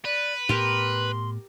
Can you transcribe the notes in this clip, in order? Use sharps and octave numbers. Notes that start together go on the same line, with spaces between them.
B4 D5
A2 B3 G4 A#4 C6